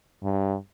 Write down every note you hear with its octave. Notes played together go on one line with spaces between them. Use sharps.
G2